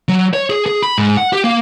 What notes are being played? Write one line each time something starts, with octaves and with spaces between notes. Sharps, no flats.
F#3
C#5
G#4
G#4
B5
G#2
F#5
G4
A#3